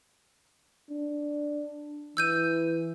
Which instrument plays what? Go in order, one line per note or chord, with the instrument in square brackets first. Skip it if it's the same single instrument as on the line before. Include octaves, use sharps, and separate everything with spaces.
[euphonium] D4
[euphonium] E3 [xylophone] E6 G6 D#7